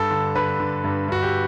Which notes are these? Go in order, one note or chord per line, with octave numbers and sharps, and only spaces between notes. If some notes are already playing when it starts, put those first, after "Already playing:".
Already playing: G2 A4
D3
D3 B4
D3
G2
G2 F#4
G4